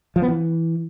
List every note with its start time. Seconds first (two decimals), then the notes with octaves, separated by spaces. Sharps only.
0.16 F3
0.22 B3
0.28 E3